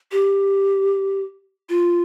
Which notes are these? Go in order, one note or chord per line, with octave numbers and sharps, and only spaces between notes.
G4
F4